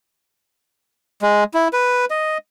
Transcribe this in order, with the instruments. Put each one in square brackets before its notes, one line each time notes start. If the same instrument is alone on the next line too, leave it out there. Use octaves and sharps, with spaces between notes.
[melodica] G#3
E4
B4
D#5